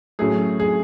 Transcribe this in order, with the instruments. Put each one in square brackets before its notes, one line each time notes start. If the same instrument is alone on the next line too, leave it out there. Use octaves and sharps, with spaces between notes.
[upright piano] A2 F#3 A3 C#4 G#4
G#4